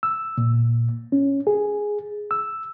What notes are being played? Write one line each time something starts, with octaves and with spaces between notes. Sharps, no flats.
E6
A#2
C#4
G#4
E6